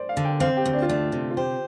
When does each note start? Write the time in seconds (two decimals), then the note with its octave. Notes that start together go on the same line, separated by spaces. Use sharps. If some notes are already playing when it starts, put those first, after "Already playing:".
Already playing: C5 D5
0.09 F5
0.17 D3
0.25 G5
0.40 C4 F5
0.57 G4
0.65 D2
0.73 D4
0.82 F4
0.89 A3 D4
1.12 C3
1.31 F4
1.37 G4 C5